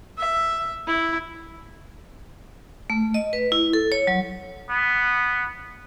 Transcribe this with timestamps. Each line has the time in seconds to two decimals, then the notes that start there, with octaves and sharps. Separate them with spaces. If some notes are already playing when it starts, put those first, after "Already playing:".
0.18 E5
0.87 E4
2.90 A3
3.14 D#5
3.33 B4
3.52 E4
3.73 A4
3.92 C#5
4.07 F#3
4.70 B3